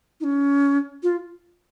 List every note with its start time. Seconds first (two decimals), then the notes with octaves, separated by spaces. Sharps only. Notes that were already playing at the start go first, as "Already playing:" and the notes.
0.20 D#4
0.24 C#4
1.03 F4